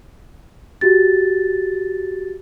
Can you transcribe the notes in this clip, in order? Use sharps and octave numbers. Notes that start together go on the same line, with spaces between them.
F#4 G4 A6